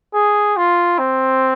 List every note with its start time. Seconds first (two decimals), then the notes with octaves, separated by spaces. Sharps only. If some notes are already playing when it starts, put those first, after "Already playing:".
0.14 G#4
0.57 F4
0.99 C4